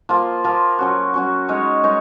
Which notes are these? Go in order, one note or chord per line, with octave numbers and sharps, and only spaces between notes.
F3 A#3 F4 A#4
F3 A#3 F4 A#4
F#3 C#4 F#4
F#3 C#4 F#4
G#3 D#4 A#4 C#5
G#3 D#4 A#4 C#5